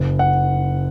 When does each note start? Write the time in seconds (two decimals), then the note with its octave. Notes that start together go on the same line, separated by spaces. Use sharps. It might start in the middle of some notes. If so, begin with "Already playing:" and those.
Already playing: F#1
0.19 F#5